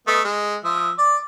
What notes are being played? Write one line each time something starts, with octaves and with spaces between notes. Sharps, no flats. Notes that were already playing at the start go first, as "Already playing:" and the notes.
A3 B3 D#5
G#3
F3 E5 D#6
D5